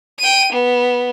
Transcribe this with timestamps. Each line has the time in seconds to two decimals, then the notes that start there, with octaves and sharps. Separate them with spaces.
0.19 G5 D#7
0.52 B3